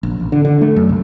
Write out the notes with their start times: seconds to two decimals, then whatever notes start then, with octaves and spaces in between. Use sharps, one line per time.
0.03 A#1
0.20 A1
0.32 D3
0.45 D3
0.61 A3
0.76 F#2
0.89 C2